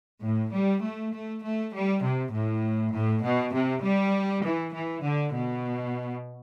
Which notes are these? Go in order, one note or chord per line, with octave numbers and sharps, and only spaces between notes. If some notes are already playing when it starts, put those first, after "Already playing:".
A2
G3
A3
A3
A3
G3
C3
A2
A2
B2
C3
G3
E3
E3
D3
B2